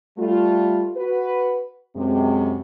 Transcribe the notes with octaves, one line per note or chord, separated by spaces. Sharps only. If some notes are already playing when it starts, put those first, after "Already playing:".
G3 A3 F4
F#4 B4
F#2 C3 G#3